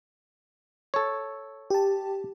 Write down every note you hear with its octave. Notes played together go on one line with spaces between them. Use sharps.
A4 C#5
G4 A5